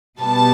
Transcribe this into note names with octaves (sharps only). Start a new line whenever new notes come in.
B2 G3 B3 A5